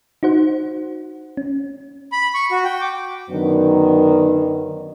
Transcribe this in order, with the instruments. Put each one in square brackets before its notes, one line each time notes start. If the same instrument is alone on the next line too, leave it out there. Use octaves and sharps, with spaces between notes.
[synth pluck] D#4 F#4 C5 F#5
C#4
[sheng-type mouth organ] B5
C#6
F#4
G5
D6
[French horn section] F#2 D3 D#3 F#3 B3 D4